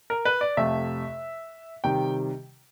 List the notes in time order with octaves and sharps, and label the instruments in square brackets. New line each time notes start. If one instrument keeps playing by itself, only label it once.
[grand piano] A#4
B4
D5
F2 C3 F3 A3 E5
C3 D#3 G3 G5